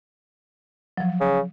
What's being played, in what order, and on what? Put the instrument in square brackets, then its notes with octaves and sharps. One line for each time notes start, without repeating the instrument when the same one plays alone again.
[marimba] F3 F#3
[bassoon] C#3